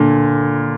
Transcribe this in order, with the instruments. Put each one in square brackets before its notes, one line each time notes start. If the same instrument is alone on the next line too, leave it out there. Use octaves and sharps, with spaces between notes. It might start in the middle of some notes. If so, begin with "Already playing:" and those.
Already playing: [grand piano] A#2 A#3 [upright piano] D3